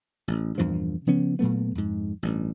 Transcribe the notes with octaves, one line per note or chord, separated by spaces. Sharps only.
A1
E2 G2 A#2 F3
C#3 F3 B3 C#4
A#2 F#3 A3 B3
F2 G#2
A1 G2